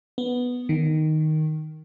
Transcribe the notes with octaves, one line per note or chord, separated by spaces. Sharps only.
B3
D#3